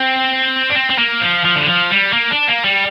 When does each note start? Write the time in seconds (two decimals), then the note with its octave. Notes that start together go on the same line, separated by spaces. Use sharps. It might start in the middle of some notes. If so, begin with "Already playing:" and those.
Already playing: C4
0.70 D4
0.75 C4
0.90 C4
0.99 A#3
1.21 F3
1.45 F3
1.56 D3
1.67 F3
1.91 G3
2.13 A#3
2.31 D4
2.48 A#3
2.65 G3